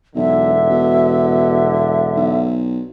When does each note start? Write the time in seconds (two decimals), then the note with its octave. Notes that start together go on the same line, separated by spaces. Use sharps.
0.15 E1 B1 D3 E5
0.70 B2
2.16 B1